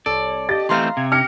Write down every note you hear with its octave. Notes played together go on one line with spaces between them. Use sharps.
C2 A4 C#5 D5
G4 D#5 D#6 A6
E3 A3 C4 F5 A#5 C6
C3 G#6
G4 F6 A#6 C#7